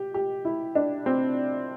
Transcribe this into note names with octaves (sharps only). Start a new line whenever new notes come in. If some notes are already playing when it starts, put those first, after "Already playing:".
Already playing: G4
G4
E4
D4
C4